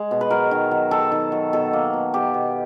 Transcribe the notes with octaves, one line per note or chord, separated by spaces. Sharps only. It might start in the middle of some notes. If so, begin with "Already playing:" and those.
Already playing: G#3
B2
B4
F#3 A#4
D#3
F#3
D#3 A4
D#3
F#3
B2 A4
A#3
B2
B2 G4
B2